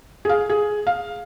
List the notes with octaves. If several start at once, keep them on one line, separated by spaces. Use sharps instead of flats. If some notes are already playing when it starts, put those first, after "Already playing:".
G#4 F5
G#4
F5